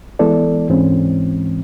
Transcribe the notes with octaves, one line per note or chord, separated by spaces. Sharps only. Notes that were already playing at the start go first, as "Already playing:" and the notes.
E3 G#3 B3 E4 A4 D5
D2 G#2 E3 G#3 C4 C#4